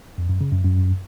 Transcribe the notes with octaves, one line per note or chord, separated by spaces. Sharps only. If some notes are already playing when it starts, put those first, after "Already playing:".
F2
F#2
C#3
F#2
F#2